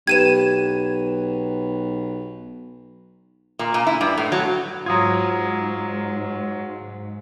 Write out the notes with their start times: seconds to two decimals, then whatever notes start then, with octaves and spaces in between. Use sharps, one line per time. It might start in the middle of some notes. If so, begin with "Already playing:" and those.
0.07 B1 G4 B4 G#6 D#7 E7
3.59 A#2
3.74 A#2
3.87 E4
4.01 G2
4.18 A2
4.32 F#3
4.86 G#2 F#3 F4 A#5 D#6 G#6